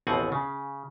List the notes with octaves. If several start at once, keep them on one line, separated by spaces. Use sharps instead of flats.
A1 D#2 B2 C4 F#5 G#5
C#3